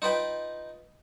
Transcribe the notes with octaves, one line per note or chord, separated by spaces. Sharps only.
D#4 F4 B4 G5